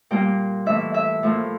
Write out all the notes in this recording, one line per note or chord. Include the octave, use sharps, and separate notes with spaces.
A#2 G3 A#3 G5
A2 E3 A#3 E5
E5
A2 F3 A#3